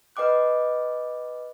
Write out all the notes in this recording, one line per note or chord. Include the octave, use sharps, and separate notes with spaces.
B4 D#5 G5 D6 F#6